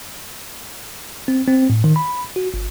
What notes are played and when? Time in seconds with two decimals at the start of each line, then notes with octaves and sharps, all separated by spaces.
1.28 C4
1.47 C4
1.70 A2
1.84 D#3
1.96 B5
2.36 F#4
2.54 G1